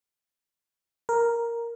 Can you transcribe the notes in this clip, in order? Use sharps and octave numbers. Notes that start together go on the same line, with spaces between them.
A#4